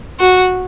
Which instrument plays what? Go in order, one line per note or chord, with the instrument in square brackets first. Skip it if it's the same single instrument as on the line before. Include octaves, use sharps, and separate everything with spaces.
[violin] F#4